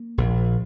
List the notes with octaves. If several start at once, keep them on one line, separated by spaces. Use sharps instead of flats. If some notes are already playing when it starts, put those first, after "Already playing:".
Already playing: A#3
A#1